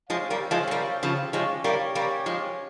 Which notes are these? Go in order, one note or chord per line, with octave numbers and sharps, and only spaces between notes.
F3 G#3 C4 G4 C#5 F5
G3 A#3
F3 G#3
G#3
G3 A#3
C#3 F3
F3 G#3 C#4 G4 C#5
G3 A#3
G3 A#3
F3 G#3